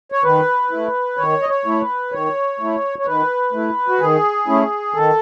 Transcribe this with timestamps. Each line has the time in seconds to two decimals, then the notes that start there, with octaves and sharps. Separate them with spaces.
0.12 C#5
0.24 D#3 B4
0.71 A3 E4
1.17 D#3 C#5
1.42 D#5
1.49 C#5
1.65 A3 E4
1.81 B4
2.12 D#3 C#5
2.60 A3 E4
2.99 C#5
3.05 D#3 B4
3.53 A3 E4
3.88 F#4
4.00 D#3 G#4
4.47 A3 C#4 E4
4.94 D#3 A4